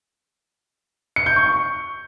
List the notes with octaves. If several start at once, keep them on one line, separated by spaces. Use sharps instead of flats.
C#7
G6
C#6